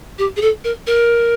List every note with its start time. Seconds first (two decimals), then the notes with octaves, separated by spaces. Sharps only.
0.18 G4
0.36 G#4
0.41 A4
0.64 A#4
0.86 A#4